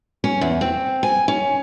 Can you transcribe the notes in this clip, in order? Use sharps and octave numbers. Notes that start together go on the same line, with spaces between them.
C#4
E2
C4
G#5
C#4